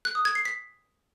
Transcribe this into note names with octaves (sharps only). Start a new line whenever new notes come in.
F#6
D#6
G#6
C7
B6